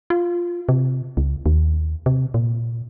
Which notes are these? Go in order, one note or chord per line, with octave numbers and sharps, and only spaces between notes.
F4
C3
C#2
D#2
C3
A#2